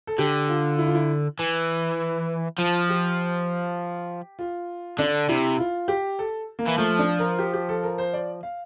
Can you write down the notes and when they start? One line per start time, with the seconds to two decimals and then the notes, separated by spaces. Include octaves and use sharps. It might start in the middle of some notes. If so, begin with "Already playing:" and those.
0.07 A4
0.18 D3 G4
0.49 F4
0.78 E4
0.87 F4
0.94 E4
1.39 E3
2.59 F3 F4
2.89 G4
4.39 F4
4.99 D3 D4
5.29 C3 E4
5.59 F4
5.88 G4
6.19 A4
6.59 A#3
6.68 E3
6.78 F3 A3
6.99 D4
7.19 A#4
7.39 G4
7.54 G4
7.69 A4
7.83 A#4
7.98 C5
8.13 D5
8.43 F5